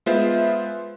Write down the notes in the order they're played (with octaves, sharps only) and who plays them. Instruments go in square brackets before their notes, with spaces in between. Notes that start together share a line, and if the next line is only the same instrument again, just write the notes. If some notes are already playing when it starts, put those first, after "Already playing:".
[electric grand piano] G#3 B3 F4 B4 C5 E5